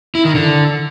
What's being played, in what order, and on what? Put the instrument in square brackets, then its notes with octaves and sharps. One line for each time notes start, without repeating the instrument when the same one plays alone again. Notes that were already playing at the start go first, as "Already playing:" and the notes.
[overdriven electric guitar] E4
D#3
D3